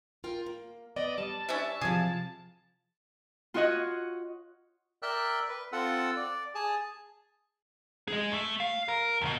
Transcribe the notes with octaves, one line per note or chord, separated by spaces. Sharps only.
F4 A#4 G5
A#3
B3 D5 D#5
G3 A5
C#4 D4 E5
C3 F3 G#4
F4 F#4 C#5 D#5 F#5
A#4 D5 E5 G5 E6 F#6
B4
C4 F4 A4 F#5 E6
D5
G#4 G#5 A5
G#4 D#5
A3
F5
A#4
D#2 B2